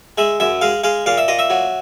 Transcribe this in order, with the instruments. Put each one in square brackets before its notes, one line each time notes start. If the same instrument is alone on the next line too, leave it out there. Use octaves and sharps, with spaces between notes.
[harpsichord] G#3 E5
F#2 E5
G#3 F5
G#3 F5
A#2 F5
E5
A#2 D#5
E5
F#3